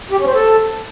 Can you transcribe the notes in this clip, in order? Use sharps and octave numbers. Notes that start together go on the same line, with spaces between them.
G4
C#4
C5
A4